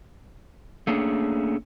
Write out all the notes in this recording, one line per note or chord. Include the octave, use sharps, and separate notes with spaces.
A3 A#3 C#4 D4 G#4